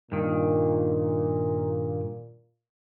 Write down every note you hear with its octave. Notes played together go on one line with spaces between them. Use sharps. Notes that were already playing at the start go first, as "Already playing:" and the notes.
G2 A#2 D#3